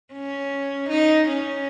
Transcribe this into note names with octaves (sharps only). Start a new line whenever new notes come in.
C#4
D#4
C#4